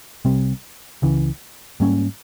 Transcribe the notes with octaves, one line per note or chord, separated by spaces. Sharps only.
C2 C3 G3 C4
C#2 C#3 E3
G#2 G3 A#3 C#4